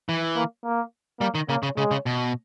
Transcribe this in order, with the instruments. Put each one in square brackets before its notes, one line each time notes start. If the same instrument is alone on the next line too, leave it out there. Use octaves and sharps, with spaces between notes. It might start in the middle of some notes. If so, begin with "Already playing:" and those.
[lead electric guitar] E3
[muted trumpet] A#3
A#3
[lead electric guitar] G3 [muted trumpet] A#3
[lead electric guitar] D#3
[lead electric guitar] C#3 [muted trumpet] A#3
[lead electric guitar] C#3
[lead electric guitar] C#3 [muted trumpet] G#3
[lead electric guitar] C#3
B2